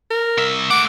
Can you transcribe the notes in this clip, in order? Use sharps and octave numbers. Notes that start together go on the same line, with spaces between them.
A#4
C2 E5
A3 F#5 D6